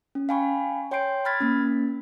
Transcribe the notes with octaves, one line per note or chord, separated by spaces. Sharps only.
C#4
F5 G5 G#5 B5 C#6
C#5 G5 C6 G6 C7 D7
B5 E6 F6 G#6 A6 B6
A#3 C#4